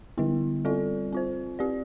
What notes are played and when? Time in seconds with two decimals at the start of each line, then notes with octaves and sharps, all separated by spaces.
0.18 D3 G3 B3 E4
0.65 G3 C4 F4 A4 D5
1.12 C4 F4 C5
1.59 C4 G4 D5